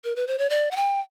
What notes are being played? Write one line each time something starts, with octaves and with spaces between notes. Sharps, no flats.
A#4
B4
C5
C#5
D5
F#5
G5